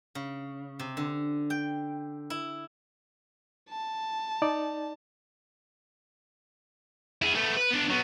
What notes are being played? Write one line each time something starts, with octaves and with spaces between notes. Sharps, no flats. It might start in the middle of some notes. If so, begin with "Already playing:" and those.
C#3
C3
D3
G5
E4
A5
D#4 D5
E4 G#4
A3 B3
B4
B3 D4
F#3 B3